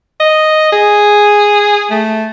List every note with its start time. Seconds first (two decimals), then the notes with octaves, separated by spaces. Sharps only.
0.21 D#5
0.72 G#4
1.91 A3